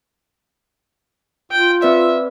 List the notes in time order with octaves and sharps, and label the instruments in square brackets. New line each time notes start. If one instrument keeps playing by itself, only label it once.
[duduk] F4 [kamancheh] G5
[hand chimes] C4 B4 D5 [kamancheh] E5